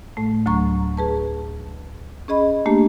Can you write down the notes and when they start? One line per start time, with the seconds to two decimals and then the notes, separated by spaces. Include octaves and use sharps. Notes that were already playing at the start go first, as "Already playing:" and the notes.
0.17 A2 A3
0.46 D2 F#3 A#5 C#6
0.97 G#4 B4 A5
2.28 C#4 G#4 D#5 B5
2.66 A3 A#3 D4 G4